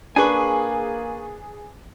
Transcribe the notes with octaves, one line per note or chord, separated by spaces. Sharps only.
A#3 D4 G#4 B4 G#5 C#6